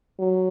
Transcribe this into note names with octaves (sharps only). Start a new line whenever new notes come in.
F#3